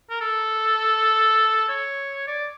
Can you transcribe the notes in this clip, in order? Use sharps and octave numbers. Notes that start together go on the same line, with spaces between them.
A#4
A4
C#5
D5